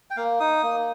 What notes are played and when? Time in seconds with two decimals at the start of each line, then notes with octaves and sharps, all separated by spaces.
0.10 G5
0.17 A#3 F5
0.40 D#4 D#6
0.63 A#3